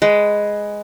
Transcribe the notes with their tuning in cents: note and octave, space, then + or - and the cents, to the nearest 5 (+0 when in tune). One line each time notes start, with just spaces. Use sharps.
G#3 +0 B4 +0